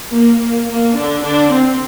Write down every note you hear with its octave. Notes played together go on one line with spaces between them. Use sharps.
A#3
A#3
A#3
D3 D4
D3 D4
C4